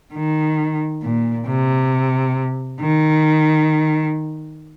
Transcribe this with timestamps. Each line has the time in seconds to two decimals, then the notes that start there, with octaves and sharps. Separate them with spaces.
0.15 D#3
1.03 A#2
1.47 C3
2.80 D#3